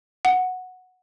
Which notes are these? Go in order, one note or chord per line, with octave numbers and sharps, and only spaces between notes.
F#5